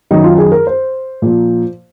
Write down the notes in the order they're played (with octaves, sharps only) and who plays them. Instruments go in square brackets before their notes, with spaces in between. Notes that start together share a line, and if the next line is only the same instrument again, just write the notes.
[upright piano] F#2 D#3 F#3 D#4
F4
G#4
A#4
C5
A#2 F3